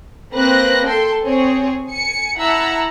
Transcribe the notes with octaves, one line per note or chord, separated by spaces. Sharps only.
A#3 C4 B4 F#6 A#6
A4 G5 C6
C4 G#4 C#5
G#5 C#7
E4 E5 F#5 A5 A#5 E6